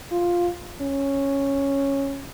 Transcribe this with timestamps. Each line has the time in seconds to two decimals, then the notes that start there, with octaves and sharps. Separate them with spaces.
0.12 F4
0.81 C#4